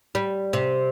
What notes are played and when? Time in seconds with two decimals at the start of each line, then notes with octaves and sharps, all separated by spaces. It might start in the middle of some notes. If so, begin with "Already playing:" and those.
0.15 G3
0.53 C3